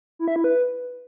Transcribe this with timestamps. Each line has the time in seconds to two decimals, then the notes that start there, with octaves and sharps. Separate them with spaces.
0.19 E4
0.28 E5
0.36 E4
0.44 B4